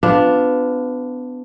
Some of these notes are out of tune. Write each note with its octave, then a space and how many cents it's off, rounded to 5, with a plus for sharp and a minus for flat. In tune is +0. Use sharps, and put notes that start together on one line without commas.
B3 +30 D4 +0 F4 +0